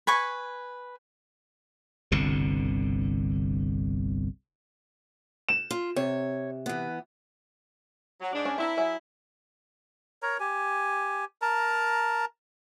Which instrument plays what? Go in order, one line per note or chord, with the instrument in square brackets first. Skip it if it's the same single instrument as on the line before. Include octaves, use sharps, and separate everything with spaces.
[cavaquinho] B4 G#5 C#6
[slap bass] G1 C2 B2 D3
[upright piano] E7
[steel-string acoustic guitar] F4
[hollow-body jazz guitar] C3 [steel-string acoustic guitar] C#5
[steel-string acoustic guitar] E3 B3
[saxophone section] F#3
G#2 D4
[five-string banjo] C#4
[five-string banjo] C4 D4 A#5 [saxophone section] E4
[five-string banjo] F#3 G#4 E5
[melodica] A#4 C#5 A#5
G4 G#5
A#4 A5 A#5